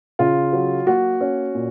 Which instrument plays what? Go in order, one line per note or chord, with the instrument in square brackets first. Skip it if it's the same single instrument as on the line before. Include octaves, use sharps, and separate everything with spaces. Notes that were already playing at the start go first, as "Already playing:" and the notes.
[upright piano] C#3 F4
F#3
A#3 F#4
C#4
A#2